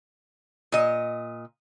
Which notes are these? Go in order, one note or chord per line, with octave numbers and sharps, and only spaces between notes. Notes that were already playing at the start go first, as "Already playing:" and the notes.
A#2 D#5